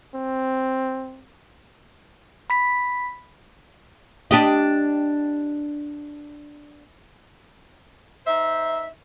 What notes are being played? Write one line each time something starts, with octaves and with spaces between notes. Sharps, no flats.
C4
B5 B6
D4 G4 D#5
D#4 C5 E5